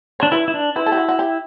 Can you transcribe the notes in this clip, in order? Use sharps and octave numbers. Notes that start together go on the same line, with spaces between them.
D4 C#5
E4 B4
E4
D4
E4 B4
A4
G4
F#4
F#4
G4